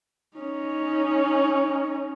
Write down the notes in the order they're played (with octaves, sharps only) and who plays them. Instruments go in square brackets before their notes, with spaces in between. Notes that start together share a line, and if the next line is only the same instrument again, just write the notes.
[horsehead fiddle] C#4 D#4